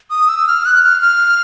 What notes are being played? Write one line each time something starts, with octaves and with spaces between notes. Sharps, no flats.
D#6
E6
F6
F#6
F6
F6